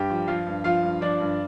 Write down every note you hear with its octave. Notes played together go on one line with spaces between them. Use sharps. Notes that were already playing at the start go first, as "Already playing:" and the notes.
Already playing: G2 G4 G5
F3
F3 F4 F5
G2
F3 F4 F5
G2
F3 D4 D5
G2